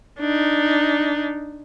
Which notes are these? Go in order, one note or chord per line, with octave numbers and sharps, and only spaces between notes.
D4 D#4